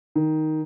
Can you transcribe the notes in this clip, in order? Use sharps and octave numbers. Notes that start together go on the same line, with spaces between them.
D#3